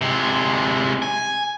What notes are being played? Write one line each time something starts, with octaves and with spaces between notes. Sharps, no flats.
C3 G#3
G#5